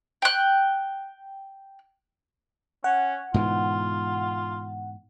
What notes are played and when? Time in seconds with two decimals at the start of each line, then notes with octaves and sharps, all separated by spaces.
0.22 G5 F#6
2.84 C#4 F#5
3.34 G#2 B2 E3 F4